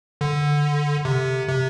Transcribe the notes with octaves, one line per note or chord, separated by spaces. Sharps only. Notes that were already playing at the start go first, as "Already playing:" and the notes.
D3
C3
C3